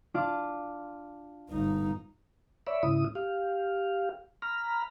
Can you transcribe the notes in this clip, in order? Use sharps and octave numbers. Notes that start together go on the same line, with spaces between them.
D4 F4 D6
G1 D#4
C#5 D5 E5 B5
G#2 C#3 E4 D#6
G4 F5
A#5 B5 F6